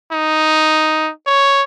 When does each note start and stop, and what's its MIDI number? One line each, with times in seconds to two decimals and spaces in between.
0.12 1.12 63
1.27 1.63 73